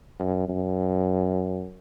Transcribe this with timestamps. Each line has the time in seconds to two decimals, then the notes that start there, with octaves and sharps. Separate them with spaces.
0.19 F#2
0.48 F#2